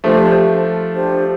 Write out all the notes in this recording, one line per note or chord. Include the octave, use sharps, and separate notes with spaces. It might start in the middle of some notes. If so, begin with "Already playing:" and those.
F3 A3 D4 G4 C5
D4 G4 C5